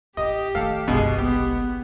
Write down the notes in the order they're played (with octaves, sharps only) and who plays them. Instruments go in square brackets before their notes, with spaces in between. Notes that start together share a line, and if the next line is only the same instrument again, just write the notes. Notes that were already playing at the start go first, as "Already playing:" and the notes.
[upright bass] A1 [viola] G4 [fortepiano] D#5
[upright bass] D#3 A3 [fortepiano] A4 F5
[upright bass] G1 C2 [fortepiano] B2 G#3
[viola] B3 [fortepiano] G4